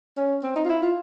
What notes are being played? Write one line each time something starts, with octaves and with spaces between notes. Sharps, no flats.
C#4
C4
D#4
F4
E4
F4